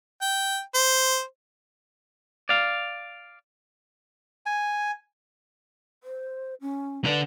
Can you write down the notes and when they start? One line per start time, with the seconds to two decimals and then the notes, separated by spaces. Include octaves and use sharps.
0.21 G5
0.75 C5
2.49 D5 F5
4.46 G#5
6.04 C5
6.61 C#4
7.05 D3 D4 B4